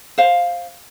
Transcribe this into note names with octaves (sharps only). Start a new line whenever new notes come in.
C5 F5